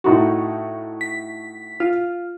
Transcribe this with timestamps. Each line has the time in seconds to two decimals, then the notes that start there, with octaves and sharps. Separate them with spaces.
0.04 A2 D#4 F#4
1.01 B6
1.80 F4